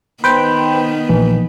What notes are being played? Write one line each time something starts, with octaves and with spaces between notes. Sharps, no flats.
D#3 B3 B4 C5 G5
A#1 E3